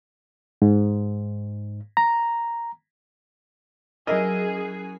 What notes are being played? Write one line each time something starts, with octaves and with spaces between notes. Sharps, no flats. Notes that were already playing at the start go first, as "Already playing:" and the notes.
G#2
A#5
F#3 C#4 E4 G#4 A#4 D#5 F#6